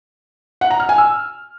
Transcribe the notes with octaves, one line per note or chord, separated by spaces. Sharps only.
F#5
A#5
F6
G#5
E6